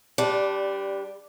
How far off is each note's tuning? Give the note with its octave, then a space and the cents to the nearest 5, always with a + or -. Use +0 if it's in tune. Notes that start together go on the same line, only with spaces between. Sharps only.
G3 +0 D4 -10 B4 +35